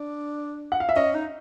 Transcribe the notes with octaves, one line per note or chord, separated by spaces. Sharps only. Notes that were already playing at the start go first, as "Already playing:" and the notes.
Already playing: D4
F#5
F5
E5
C#4 D#5
D#4